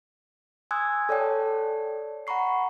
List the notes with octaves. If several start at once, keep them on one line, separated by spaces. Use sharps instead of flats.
G#5 C6 D#6 E6 F#6 G#6
A4 C#5 D5 G5 A5
F#5 A#5 B5 C#6 C7